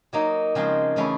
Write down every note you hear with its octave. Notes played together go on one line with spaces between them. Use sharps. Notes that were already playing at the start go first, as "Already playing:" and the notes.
F#3 A#3 D#4
C#3 F3 G#3 C4 F4
C#3 E3 A3 C#4 E4